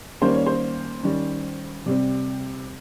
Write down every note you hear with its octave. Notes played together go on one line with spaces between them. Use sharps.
D#3 G3 A#3 C#4 C5
C#5
C5
D#3 G3 C#4
C3 G3 C4